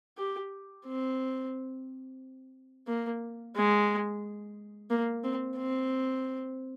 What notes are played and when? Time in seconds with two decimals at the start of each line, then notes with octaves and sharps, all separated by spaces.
0.18 G4
0.86 C4
2.88 A#3
3.56 G#3
4.90 A#3
5.24 C4
5.57 C4